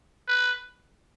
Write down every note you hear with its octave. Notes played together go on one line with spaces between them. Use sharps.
B4